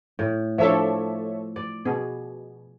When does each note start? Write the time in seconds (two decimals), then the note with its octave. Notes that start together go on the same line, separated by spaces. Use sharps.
0.19 A2
0.58 F3 D4 A4 C#5 E5
1.56 D5
1.85 B2 G#4